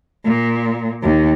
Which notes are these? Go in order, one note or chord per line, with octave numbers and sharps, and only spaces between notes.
A#2
D#2